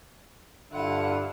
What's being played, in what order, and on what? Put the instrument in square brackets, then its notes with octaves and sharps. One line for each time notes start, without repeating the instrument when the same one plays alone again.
[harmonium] G2 [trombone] D3 [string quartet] E4 F4 F#5